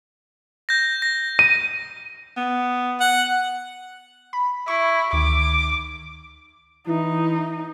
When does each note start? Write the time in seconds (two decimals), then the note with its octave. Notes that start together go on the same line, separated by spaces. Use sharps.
0.69 G6 A#6
1.02 A#6
1.39 D#7
2.37 B3
3.00 F#5
4.33 B5
4.68 E4 C#6
5.13 D2 D#3 D6
6.87 E3 D#4 E4